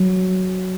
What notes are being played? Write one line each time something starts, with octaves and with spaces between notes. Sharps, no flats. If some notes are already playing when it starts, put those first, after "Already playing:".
Already playing: F#3